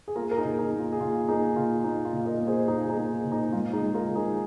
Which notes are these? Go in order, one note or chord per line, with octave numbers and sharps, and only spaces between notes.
G#4
A#3 F4 A#4
A#4
D#4 G#4
A#2
D#4
A#3
F4
G#4
A#2 F4
A#3 D#4 G#4
A#2 F4
A#3 D#4
F4
A#2
A#4 D#5
A#3
G#4 C5
A#2 D#4 G#4
D#4 G#4
A#3
A#2
D#4
G#2 F4
D#4 G#4
G#2
G#4
F4 A#4
D#3
D#4 G#4